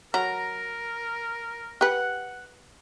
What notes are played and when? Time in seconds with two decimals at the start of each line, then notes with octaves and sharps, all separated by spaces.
0.14 F#3 A#4 A#5
1.81 G4 B4 F#5